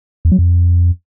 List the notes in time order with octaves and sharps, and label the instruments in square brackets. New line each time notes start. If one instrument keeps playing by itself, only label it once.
[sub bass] E2
F#3
F2